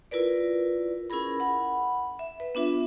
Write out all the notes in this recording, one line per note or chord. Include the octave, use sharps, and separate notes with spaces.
E4 F4 A#4 B4 D5
C#4 E4 G#4 A#4 B5
F#5 B5
E5
B4
B3 D4 F4 E5